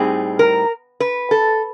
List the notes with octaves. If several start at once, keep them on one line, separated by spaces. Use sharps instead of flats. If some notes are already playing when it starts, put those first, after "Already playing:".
Already playing: A2 G3 C4 D#4 G#4
A#4
B4
A4